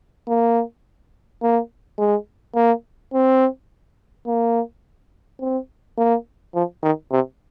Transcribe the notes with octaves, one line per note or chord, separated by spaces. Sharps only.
A#3
A#3
G#3
A#3
C4
A#3
C4
A#3
F3
D#3
C3